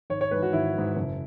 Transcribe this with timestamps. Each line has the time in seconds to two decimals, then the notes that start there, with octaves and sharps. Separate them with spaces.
0.10 G#1 C#5
0.21 C#5
0.31 G#2 E3 B4
0.42 F#4
0.53 G#1 E4
0.75 G#2 E3
0.97 F#1